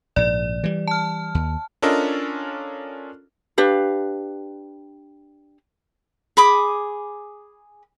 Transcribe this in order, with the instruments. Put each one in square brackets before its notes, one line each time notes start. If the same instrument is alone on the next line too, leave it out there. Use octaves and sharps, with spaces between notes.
[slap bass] A#1 G#2 [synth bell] D5
[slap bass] E3 G3
[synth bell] A5 F6
[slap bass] D#2
[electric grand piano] C#4 D4 F4 A4 A#4 D#5
[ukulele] D4 G4 B4 F5
[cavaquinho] G#4 B5 D6 D#6